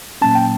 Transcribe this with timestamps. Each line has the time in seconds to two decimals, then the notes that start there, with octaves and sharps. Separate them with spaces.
0.22 A#2 F#3 A#3 C#4 A5
0.35 G5